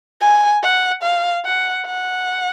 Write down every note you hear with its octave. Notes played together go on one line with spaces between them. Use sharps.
G#5
F#5
F5
F#5
F#5